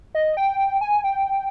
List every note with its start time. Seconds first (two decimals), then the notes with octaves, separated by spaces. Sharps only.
0.15 D#5
0.37 G5
0.81 G#5
1.04 G5